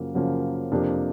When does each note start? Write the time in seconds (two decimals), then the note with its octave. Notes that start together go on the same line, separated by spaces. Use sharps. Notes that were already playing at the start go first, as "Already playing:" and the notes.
Already playing: F#2 C#3 F3 A#3
0.15 F#2 C#3 F3 A#3
0.72 F2 C3 F3 A#3 D4